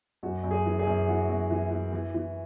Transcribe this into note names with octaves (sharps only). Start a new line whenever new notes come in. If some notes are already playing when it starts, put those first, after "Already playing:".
F#2 F#4
F#2
G#4
E3
G#4
F#2
E3 F#4
F#2
E3
E3
E3
E3